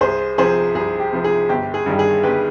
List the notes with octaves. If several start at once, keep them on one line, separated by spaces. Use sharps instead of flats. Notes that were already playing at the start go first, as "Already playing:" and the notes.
C2 G#4 C5
C3 F3 G#4 C5
C2 G#4
G4
C3 F3
G#4
G1 G4
G#4
G2 D#3 G3
G#4
G1 G4 B4